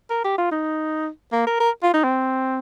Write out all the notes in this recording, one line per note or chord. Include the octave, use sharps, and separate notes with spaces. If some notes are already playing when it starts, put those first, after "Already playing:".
A#4
G4
F4
D#4
A#3
A#4
A#4
F4
D#4
C4